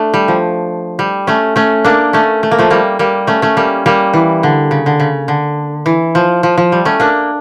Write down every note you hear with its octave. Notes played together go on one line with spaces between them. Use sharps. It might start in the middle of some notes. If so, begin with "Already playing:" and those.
Already playing: A3 D4
G3
F3
G3
A3 C#4
A3 C#4
A#3 D4
A3 C#4
A3
A#3
F3 A3
G3 A#3
G3 A#3
A3 C#4
A3 C#4
G3 A#3
G3 A#3
E3
D3
C#3
D3
C#3
D3
E3
F3
F3
F3
G3
A3 C#4
A#3 D4